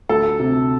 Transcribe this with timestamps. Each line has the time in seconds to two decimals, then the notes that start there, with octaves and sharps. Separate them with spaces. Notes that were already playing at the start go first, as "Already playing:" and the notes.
0.09 D2 A4
0.39 C3